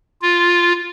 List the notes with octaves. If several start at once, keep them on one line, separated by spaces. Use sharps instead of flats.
F4